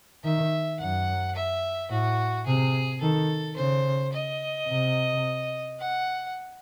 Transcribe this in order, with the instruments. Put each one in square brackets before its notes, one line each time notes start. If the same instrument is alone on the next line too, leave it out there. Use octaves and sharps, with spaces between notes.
[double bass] D#3 [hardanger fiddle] E5
[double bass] F#2 [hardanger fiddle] F#5
[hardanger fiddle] E5
[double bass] A2 [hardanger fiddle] F#4
[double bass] C3 [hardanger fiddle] G#4
[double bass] D#3 [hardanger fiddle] A4
[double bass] C#3 [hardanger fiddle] C5
[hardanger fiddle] D#5
[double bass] C3
[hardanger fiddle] F#5